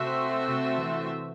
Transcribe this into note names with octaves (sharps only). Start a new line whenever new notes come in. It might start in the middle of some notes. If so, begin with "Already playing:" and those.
Already playing: C3 A3 C4 F#4 C5 E5
C3
E3